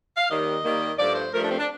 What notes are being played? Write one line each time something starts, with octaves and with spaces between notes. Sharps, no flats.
F5
D#2 D#3 G3 A#3 D#5
D#2 D#3 G3 A#3
G2 F3 A3 D5
C5
G2 F3 A3 A#4
D4
C4
D4